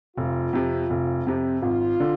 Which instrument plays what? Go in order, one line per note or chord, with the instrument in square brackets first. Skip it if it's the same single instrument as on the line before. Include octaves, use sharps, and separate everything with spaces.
[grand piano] F1 [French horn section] F4
[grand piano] F2 C3
F1
F2 C3
[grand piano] G#1 [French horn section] F4
[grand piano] D3